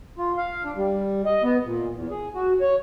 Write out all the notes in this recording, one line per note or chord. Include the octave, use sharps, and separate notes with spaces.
F4
F5
D4
G3
D#5
B3
A#2
E2
G#4
F#4
C#5